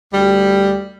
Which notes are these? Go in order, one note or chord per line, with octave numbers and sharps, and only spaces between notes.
D2 G3